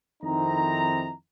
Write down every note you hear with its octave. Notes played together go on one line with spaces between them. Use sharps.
F2 D#3 C4 D#4 E4 A#5